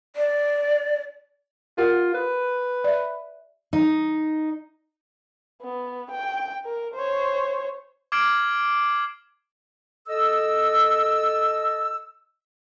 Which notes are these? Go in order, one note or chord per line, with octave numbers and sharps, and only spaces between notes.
D5
F4 G4 A#4 F#5
B4
D5 E5
D#4
B3
G5
A#4
C5 C#5
D6 F6 G#6 C7 D7 F#7
A4 D#5 E6